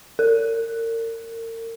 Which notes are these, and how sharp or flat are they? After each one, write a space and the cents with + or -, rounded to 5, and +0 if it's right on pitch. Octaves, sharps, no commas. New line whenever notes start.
A#4 -35